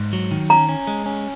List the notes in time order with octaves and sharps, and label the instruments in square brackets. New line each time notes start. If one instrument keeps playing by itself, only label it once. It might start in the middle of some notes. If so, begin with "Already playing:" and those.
Already playing: [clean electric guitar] G#2
F#3
D#3
[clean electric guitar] C#4 [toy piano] A#5
[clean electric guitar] C#4
G#3
C#4